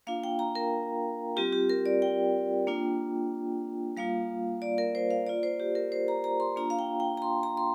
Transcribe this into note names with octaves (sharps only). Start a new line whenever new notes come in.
A#3 D4 F4 F5
G5
A#5
A#4
G3 C4 F4 G4
G4
A#4
D5
G5
A#3 D4 F4
G3 A#3 F4 F5
D5
A#4
C5
F5
A#3 F4 D5
C5
G4
A#4
C5
A#5
A#5
C6
A#3 D4 F4 A#5
F5
G5
G5
A#5
C6
A#5
C6